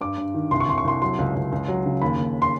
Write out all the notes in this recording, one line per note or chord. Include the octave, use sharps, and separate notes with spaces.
G2 D6
G2
D#3
C2 C6
C#6
C2 C6
C#6
C2 C6
F#3 C6
C#2
C#2
C#2
F#3
C#3
D#2 B5
D#2
C6